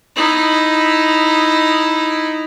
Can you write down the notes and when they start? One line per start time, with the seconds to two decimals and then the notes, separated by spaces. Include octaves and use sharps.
0.16 D#4 E4